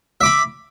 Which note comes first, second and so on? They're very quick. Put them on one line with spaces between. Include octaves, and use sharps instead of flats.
E5 D6 B5